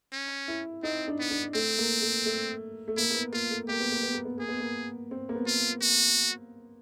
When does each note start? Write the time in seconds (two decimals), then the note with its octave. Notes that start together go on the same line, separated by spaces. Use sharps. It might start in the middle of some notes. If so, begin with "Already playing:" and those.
0.12 C#4
0.48 E4
0.83 C4 D#4
1.08 D4
1.19 B3
1.31 D4
1.55 A3 C4
1.79 A#3
2.02 A3
2.26 A3
2.88 A3
2.97 A#3 E4
3.10 A#3
3.15 B3
3.32 A#3 F4
3.51 A3
3.68 A#3 G4
3.80 B3
3.91 A#3
4.03 B3
4.14 A#3
4.25 B3
4.38 A#3 G#4
4.49 B3
4.60 A#3
5.11 C4
5.29 A#3
5.35 B3
5.47 F4
5.82 F#4